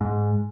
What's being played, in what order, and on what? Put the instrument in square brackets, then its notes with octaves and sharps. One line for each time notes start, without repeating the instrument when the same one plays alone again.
[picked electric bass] G#2